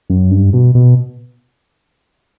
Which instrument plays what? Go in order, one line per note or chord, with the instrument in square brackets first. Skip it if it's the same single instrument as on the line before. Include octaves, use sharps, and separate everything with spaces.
[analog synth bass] F#2
G2
B2
B2